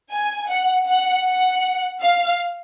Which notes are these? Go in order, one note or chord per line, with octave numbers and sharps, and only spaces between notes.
G#5
F#5
F#5
F#5
F5